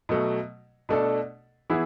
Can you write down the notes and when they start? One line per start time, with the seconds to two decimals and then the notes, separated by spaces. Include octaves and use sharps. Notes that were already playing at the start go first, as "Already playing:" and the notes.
0.09 B2 F#3 A3
0.89 B2 A3 D4 A4
1.70 E3 B3 E4 G#4